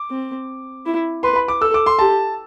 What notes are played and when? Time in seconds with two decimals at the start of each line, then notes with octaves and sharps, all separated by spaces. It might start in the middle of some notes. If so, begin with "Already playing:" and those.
Already playing: D6
0.11 C4
0.85 E4
1.23 B4 C6
1.36 B5
1.48 D6
1.61 A4 E6
1.74 D6
1.86 C6
1.99 G4 A5